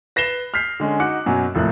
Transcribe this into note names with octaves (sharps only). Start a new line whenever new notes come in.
B4 A#6 C7 E7 G7
F6 G6 B6 C7
D3 G#3 C#4
D#4 F#4 D6 F#6 C#7
F#2 B2 F#3 C#4
F1 A2 F3 A#3 F#6